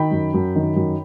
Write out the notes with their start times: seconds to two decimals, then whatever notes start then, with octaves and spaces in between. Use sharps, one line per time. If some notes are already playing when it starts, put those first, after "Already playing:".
Already playing: D#3 G5 B5
0.11 F#2
0.34 F#2
0.56 D#3
0.76 F#2